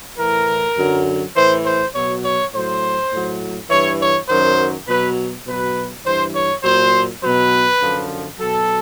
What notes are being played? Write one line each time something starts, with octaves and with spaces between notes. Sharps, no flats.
A2 E3 A#4
F#2 D3 F#3
A2 E3 C5
C5
B2 F#3 C#5
C#5
A2 F#3 C5
A2 F#3
G2 E3 C#5
C#5
F#2 D#3 F#3 C5
B2 F#3 B4
B2 F#3 B4
G2 E3 C5
C#5
A#2 F#3 C5
B2 F#3 B4
F#2 D3 F3
B2 F#3 A4